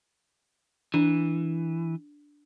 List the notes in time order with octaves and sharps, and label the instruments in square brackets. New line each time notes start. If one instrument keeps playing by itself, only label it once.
[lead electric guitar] E3 [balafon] D4